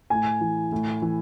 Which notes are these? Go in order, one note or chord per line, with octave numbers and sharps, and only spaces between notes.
A2 G#5
E3
A2
E3